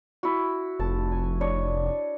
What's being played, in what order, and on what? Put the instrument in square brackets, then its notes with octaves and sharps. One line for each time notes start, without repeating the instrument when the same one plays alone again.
[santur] E4 F#4
[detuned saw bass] F1 [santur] A5
[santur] G#5
D4 C#5 D#5